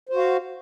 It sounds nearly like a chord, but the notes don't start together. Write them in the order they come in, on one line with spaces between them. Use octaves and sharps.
C5 F#4 F5